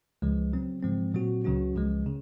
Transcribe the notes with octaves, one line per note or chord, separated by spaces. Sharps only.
C#2 C#3 F3 G#3
C#3 F#3 C4
G#2 F3 G#3 C4
A#2 F#3 C4 F#4
C#2 C#3 F#3 C#4 F#4
C#2 C#3 F3 G#3
C#3